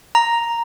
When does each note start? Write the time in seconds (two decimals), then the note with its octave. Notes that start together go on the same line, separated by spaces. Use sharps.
0.15 A#5